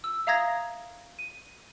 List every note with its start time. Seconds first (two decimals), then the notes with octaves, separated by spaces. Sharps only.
0.04 E6
0.27 E5 F5 A#5 D#6 G#6 A#6
1.19 D#7